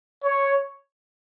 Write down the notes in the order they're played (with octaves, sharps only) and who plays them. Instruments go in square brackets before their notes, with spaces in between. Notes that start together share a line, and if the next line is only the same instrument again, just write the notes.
[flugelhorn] C#5